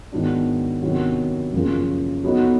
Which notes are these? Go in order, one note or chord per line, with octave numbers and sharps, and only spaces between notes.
G#2 D#3 F#3 B3 D4
C3 D#3 F#3 B3 D4
F#2 C#3 F3 A#3
F#3 B3 D#4 F#4 A4